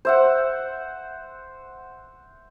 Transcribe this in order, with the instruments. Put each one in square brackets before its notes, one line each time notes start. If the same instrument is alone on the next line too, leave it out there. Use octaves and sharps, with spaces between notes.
[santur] C5 E5 F#5